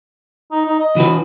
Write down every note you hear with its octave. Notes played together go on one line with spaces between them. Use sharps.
D#4
D#4
D#5
E3 F#4 B4